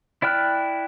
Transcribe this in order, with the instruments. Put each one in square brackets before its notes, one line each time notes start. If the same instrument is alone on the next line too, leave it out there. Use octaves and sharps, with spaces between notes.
[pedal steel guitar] E4 D5 G5 F6 F#6